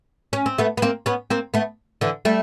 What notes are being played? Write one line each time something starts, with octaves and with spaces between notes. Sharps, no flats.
C#4
C4
A3 B3
B3
A#3 C4
B3 C#4
A#3 C4
A3 B3
D3 E3
G3 A3